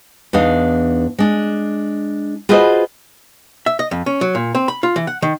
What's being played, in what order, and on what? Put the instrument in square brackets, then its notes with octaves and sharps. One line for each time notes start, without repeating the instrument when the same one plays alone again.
[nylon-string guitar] E2 D4 D#4 F5
G#3 D4
F4 F#4 G#4 B4 C5 D#5
[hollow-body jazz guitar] E5
D#5
F2
C#4
F#3
A#2
C4
B5
F4
E3
F#5
D#3